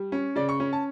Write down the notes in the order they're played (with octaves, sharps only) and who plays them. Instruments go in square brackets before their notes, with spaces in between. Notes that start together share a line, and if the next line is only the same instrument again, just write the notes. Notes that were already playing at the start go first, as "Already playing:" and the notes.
Already playing: [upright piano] G3
C#4
C#3 D5
C#6
C#4
A5